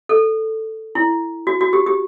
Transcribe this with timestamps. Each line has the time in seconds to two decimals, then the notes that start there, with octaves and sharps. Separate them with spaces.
0.09 A4
0.95 E4
1.47 F#4
1.61 F#4
1.73 G4
1.87 G4